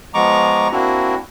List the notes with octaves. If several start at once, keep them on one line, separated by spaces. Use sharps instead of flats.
F3 G#3 B3 A#5 C#6 D6
A#3 C4 D4 E4 F#4